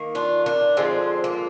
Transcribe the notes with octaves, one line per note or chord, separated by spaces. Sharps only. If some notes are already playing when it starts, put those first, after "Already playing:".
Already playing: D#3 A#3
D4 F4
A#3 D4
D3 F3 G#3 C4
A#3